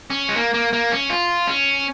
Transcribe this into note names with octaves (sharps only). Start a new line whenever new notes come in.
C#4
G#3
A#3
A#3
A#3
C#4
F4
C#4